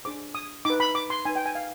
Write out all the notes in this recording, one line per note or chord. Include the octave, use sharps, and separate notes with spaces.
D4 G#4 C5 D6
D#6
D#4 B4 D6
B5
D6
C6
D#4 B4 G#5
G5
G#5
F5